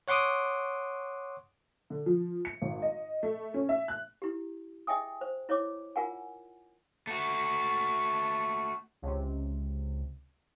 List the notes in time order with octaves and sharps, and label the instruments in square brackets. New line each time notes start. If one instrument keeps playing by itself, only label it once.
[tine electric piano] C#5 F#5 C6 D6 D#6
[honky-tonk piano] D3
F3
C#7
G#1
D#5
A3
C#4
E5
F#6
[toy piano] E4 G4
G#4 D#5 E5 G5 G#5 D#6
C5
E4 C#5 D#5 D6
F4 A#4 F#5 G#5
[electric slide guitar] A3 F#4
[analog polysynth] C#2 C3